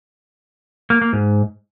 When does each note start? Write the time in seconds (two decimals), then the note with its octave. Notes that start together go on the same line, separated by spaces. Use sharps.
0.90 A#3
1.02 A#3
1.13 G#2